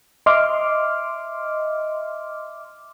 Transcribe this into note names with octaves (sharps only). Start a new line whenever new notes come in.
D#5 E5 C6 D6 F6